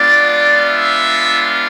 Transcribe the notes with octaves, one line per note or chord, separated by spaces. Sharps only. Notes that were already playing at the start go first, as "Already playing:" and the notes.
Already playing: G#3 B3 D4 F4 D5
E5